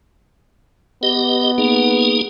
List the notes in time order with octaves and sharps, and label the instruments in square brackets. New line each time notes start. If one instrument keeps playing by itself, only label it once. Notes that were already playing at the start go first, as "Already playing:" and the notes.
[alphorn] B3 [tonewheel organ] G4 D#5
[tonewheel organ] A#3 D#4 G#4